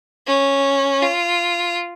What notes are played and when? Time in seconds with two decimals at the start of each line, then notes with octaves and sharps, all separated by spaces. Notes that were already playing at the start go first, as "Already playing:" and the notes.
0.26 C#4
1.03 F4